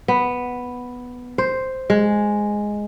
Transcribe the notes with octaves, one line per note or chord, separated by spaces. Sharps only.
B3
C5
G#3